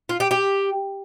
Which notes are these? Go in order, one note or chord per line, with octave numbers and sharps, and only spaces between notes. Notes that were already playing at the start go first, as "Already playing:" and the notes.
F4
G4
G4